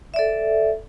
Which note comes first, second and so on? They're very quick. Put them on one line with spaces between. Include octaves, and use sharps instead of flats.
E5 D5 A4